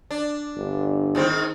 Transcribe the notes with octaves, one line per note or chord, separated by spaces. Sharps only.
D4
G1
G#2 D#3 C4